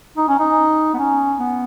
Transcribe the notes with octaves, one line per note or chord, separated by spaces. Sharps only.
D#4
C#4
D#4
B3
C#4
B3